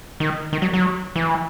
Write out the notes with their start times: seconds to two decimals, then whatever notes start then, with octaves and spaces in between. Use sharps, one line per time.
0.20 D#3
0.53 D#3
0.62 F#3
0.73 F#3
1.16 E3